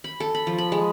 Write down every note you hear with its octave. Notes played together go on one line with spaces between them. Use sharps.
B5
A4
B5
F3
B5
G#3